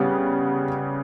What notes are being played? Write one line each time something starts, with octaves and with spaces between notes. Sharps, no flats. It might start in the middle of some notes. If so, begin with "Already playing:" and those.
Already playing: C#3 G3 B3